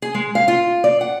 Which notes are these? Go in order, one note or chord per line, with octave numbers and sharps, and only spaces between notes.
G#4
G#3
F5
F4
D5
F#5